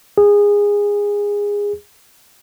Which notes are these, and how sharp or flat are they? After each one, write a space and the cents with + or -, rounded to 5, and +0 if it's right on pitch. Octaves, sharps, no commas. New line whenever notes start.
G#4 -20